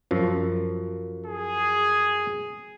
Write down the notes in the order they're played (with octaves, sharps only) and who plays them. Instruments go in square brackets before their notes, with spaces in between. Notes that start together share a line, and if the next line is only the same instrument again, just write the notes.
[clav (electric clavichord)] F#2 F3
[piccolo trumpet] G#4